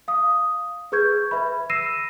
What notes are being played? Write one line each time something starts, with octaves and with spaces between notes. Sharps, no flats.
F5 D#6
G#4 B4 C#6 G6 G#6
B4 E5 B5
E6 A#6 C7 D#7 E7